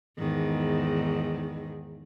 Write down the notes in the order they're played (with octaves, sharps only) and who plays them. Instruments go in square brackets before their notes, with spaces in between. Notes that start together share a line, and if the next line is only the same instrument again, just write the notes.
[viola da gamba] E2 G#2 D#3